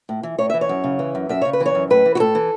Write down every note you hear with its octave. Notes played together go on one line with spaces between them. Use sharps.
A2
E3
A2 C#5
E3 E5
C#5
F#2
C#3
E3
F#2
F#2 E5
C#3 C#5
B4
E3
C#5
F#2
A2 B4
E3
F#4
A2 A4
E3